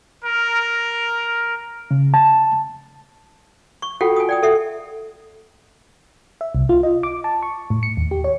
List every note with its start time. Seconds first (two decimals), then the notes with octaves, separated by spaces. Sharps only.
0.23 A#4
1.91 C#3
2.14 A5
3.82 C#6
4.01 F4 F#4 A4 F#5 G5
4.16 G#5 D#6
4.29 D5 G5 D#6
4.43 A4 E5 F#5
6.41 E5
6.55 C2
6.69 F4
6.83 D#5
7.03 D6
7.24 A5
7.43 C#6
7.70 A2
7.83 C#7
7.97 D#2
8.11 G4
8.24 C#5